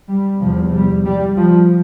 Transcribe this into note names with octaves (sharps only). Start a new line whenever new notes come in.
G3
E2 C3 F3
G3
G3
F3